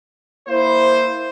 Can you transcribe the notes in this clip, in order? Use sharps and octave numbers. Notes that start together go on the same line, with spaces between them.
A#3 E4 C5